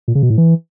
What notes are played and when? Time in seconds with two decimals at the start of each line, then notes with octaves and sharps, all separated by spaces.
0.08 A#2
0.15 C#3
0.23 B2
0.30 A2
0.38 E3